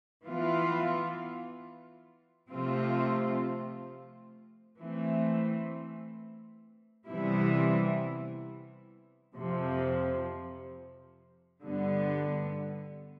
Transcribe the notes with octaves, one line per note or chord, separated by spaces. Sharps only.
E3 B3 F4
C3 F3 A3 C4 F4
E3 A3 C4
C3 E3 G3 B3 E4
F2 C3 F3
G2 D3 G3 B3